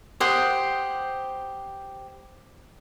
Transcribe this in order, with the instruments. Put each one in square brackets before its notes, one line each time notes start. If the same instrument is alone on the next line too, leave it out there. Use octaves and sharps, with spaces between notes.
[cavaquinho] G4 C5 F#5 D#6